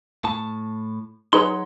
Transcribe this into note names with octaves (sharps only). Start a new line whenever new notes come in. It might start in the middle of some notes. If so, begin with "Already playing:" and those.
A2 A5
F#3 D#4 G#4 B4 C#5 C6